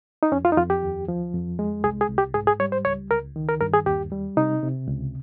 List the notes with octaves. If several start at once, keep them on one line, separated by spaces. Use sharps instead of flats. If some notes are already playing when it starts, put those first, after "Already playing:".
D#4
F2 C#4
F4
D#4
F2 F4
G4
D#2
F3
F2
G#3
C2 G#4
G#4
C2
G4
G#2 G#4
G#4
G3 C#5
C5
C#2 C#5
C#2 A#4
D#3
A#4
G2 A#4
G#4
D#2 G4
G3
C3 D#4
C3
C#2